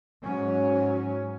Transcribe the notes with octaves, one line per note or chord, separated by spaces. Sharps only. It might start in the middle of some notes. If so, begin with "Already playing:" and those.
G#2 F#3 C#4